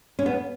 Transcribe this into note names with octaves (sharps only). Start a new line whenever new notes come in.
C#4
B3